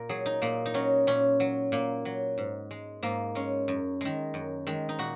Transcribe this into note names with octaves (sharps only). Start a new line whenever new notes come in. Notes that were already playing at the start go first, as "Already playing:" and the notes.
Already playing: A#2 A#4
F#3 G#4
D#4
A#2 A#3
D#4
F#3 C#4
A#2 C#4
F#3
A#2 A#3
F#3
G#2
G#3
G#2 A#3
G#3 C#4
F#2
D#3 G#3
F#2
D#3 G#3
D#4
A#2 F#4